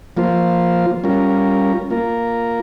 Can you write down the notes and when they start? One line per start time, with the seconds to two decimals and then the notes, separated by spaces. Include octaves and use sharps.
0.17 F3 A#3 F4 C5
1.04 G3 C#4 F4 A#4
1.90 A#3 F4 A#4